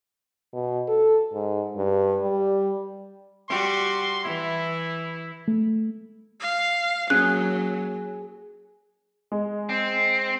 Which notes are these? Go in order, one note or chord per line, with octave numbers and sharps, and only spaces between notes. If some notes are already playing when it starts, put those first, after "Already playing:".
B2
A4
G#2
G2
G3
G3 F#4 G4 C6
E3 E4
A3
F5
F#3 A#3 C#4 G#4 F#6
G#3
C4